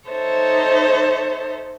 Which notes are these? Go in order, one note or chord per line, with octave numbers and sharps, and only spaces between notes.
D#4 A4 C5 C#5 E5